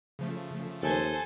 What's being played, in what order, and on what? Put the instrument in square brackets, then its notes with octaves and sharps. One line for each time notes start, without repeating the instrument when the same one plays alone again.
[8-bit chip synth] C#3 F3 A3
[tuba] D#2 [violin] A4 C5 [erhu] G#5